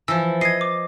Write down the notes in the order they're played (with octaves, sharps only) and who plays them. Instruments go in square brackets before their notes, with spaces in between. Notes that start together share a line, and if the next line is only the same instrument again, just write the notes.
[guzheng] E3 F3 [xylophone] E6
[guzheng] D#5 [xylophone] G#6 C7
[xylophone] D6